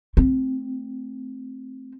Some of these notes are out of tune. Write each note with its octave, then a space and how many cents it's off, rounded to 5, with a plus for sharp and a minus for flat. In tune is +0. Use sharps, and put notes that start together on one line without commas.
A3 +0 C4 +0